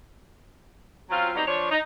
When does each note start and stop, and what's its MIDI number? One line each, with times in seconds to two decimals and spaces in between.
1.10 1.31 54
1.10 1.31 60
1.10 1.31 61
1.10 1.31 65
1.35 1.42 54
1.35 1.42 55
1.35 1.42 59
1.35 1.42 60
1.35 1.42 63
1.47 1.69 53
1.47 1.69 62
1.47 1.69 73
1.70 1.79 63